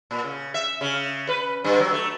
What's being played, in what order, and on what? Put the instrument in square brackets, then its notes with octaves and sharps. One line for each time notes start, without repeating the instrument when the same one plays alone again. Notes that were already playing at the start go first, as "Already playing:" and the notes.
[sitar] A#2
C#3
E5
C#3
B4
G2
F#3
A3